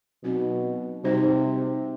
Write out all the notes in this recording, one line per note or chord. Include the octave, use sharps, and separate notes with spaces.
B2 F#3 C4 D#4 F#4 B4
C3 G3 D#4 F#4 C5